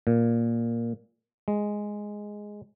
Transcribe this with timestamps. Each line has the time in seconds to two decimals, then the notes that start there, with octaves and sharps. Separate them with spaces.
0.07 A#2
1.48 G#3